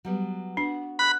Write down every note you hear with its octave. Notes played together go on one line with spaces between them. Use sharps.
F#3 G3 B3
B3 D4 F#4
B5 F#6